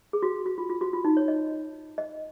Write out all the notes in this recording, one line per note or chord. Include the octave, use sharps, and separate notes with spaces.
G#4
F#4
F#4
F4
F4
F#4
F4
D#4
C#5
D#5
D#5